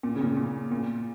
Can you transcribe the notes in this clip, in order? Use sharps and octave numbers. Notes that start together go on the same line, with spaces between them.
A#2
C#3
A#2
A#2
A#2